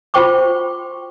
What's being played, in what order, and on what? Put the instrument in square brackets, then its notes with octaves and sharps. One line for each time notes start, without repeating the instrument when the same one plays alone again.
[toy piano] F4 F#4 C5 G5 C#6 D6